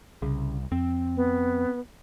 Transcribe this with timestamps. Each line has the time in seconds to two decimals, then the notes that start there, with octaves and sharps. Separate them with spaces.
0.22 C2 C#3
0.72 F2 C4
1.16 B3